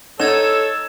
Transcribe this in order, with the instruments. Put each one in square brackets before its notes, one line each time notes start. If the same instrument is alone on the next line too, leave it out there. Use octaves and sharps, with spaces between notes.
[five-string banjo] D#4 [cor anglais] A4 [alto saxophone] C#5 [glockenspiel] E6 G#6 E7